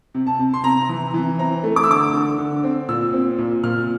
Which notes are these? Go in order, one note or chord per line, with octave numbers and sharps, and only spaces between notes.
C3
A5
C3
C6
C3 A#5
E3
E3
C4 A#5
A3
D6
E6
D3 D6
D3
D3
C4
A#2 E6
C4
A#2
A#2 F6